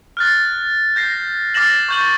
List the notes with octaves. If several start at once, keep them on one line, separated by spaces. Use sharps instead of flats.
F6 F#6 A6
G6 A#6 C7
D6 F6 A6 A#6 E7 F#7
C#6 G6 F#7